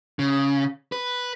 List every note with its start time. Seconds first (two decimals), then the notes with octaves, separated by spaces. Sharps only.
0.19 C#3
0.92 B4